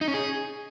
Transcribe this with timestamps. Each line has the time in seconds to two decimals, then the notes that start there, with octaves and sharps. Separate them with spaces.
0.01 D#4
0.08 C#4
0.14 G#4